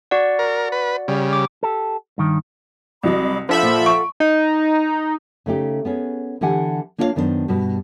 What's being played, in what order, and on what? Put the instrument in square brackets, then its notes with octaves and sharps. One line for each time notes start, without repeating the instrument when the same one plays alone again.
[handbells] F#4 D5 F#5
[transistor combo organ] A#4
B4
C#3 G3
[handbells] D6
[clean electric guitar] G4 A4
G2 D#3
[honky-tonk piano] C2 F#3 D#5 [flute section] B5 D6
[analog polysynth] F3 E5 B5 [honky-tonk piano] D4 [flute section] F4 A4 F#5
[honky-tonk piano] A#2
[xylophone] C#6 [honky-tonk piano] D7
[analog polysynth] D#4
[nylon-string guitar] C#3 A3 D#4 G4
B3 C#4 G#4
D3 E3 D4 G4 F#5 G#5
A#3 D4 F4 C#5 D5 F5
F#2 D#3 B3 D4 G4 C5
G2 B2 G3 F#4 B4